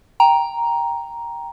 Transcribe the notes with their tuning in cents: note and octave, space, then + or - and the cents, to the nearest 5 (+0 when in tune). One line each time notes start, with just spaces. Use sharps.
G5 +5 A#5 +5